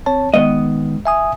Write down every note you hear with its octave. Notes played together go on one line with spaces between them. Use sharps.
C4 C#5 A5
D#3 G#3 B3 D#5
E5 G#5 D#6